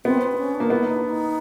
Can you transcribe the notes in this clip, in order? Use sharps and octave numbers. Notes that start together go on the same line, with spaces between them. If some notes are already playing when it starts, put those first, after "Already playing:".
B3 C4
C4
D4
C#4
D4
A#3
B3 E4
D#4
D4
D#4